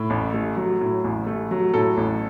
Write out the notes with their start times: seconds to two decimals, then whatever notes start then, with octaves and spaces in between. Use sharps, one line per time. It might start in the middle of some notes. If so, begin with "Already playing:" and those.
Already playing: A2
0.10 A1
0.34 A3
0.57 F#3
0.81 A2
1.04 A1
1.27 A3
1.51 F#3
1.74 A2 A4
1.97 A1